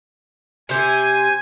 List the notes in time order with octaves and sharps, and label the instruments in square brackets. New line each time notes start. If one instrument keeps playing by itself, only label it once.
[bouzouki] C3 G4 C5 [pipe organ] G#5